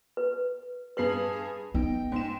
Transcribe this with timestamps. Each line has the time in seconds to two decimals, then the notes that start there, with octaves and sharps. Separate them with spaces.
0.17 B4
0.97 G2 G#4 B4 C7 F#7
1.74 B3 D#4 G5
2.12 G#2 E7